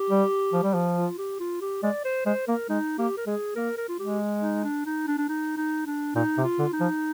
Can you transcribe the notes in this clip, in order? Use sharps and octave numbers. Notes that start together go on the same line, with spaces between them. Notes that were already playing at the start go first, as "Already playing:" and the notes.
Already playing: G4
G3
F3
G3
F3
F4
G4
F4
G4
G#3 D5
C5
G#3 C5
A#3 A#4
G#3 D#4
A#3 G4
A#4
G#3 G#4
A#3 A#4
A#4
F4
G#3 G4
D#4
D4
D#4
D4
D4
D#4
D#4
D4
A#2 D#4
C3
F4
D3
D#4
F3